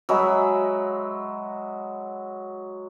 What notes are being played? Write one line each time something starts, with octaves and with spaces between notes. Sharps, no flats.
F#3 G#3 E5 B5